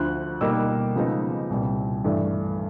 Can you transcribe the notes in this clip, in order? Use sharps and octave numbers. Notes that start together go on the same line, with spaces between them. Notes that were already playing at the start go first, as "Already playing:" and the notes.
Already playing: D2 D3 F3 F#6
B2 G3 A#3 D#4 D6 E6
C#3 F3 G#3 B3 D#4
C2 A#2 G3
G2 E3 A3 D4